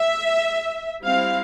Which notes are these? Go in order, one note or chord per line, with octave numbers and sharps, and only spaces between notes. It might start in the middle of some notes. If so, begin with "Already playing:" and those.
Already playing: E5
G3 C4 E4 F5